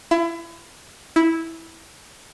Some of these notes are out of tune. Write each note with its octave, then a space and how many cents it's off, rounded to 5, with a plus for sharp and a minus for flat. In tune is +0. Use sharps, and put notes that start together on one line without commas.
E4 +30
E4 -10